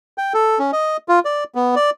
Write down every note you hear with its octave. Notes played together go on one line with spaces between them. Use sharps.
G5
A4
C#4
D#5
F4
D5
B3
D5